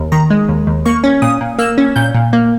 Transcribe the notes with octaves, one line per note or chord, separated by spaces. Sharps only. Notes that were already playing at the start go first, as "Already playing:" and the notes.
Already playing: D#2
D#3 A#5
G#3
D#2
D#2
A#3 C#6
C#4
A#2 D#6
A#2
A#3 E6
C#4
A#2 G6
A#2
A#3